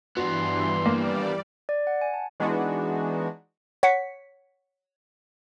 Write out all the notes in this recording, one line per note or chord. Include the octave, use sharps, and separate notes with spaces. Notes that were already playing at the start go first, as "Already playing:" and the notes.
G2 E3 B3 D4 F#4 C6
G3 A#3 D5
D5
F#5
G#5
A5
E3 G#3 B3 D4 D#4 F#4
C#5 F#5 B6 C#7